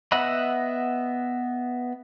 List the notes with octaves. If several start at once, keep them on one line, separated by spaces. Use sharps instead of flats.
B3 D#5 E5 F#5 B5